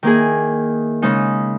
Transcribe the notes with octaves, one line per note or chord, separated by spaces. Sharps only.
D#3 A#3 E4 G#4
C#3 G#3 D#4